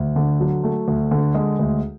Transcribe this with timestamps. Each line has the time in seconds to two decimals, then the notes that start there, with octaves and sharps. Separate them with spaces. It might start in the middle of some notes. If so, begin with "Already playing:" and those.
Already playing: D2
0.16 D3
0.40 F#3
0.64 A3
0.88 D2
1.11 D3
1.35 G#3
1.59 D2